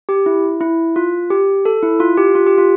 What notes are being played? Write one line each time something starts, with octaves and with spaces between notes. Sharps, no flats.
G4
E4
E4
F4
G4
A4
E4
F4
G4
F4
G4
F4